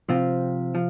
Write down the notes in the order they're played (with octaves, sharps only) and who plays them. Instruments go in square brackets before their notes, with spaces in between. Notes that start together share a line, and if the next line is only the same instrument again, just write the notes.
[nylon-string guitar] C3 [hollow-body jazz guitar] F3 C4 F4
[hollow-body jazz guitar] F3